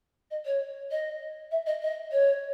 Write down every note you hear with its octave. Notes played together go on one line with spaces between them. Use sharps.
D#5
C#5
D#5
E5
D#5
D#5
C#5